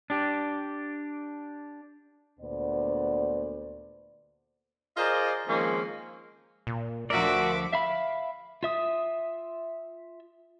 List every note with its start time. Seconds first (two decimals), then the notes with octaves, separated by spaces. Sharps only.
0.10 D4 G4
2.39 D2 A#2 B3 C5 D5
4.96 F4 G#4 A#4 C5 D5 D#5
5.47 D#3 F3 G#3 A#3 C4 C#4
6.67 A#2
7.10 D2 D3 F3 F#4 A#4 D5 E5 D6
7.72 E5 F5 B5
8.63 F4 E5 D#6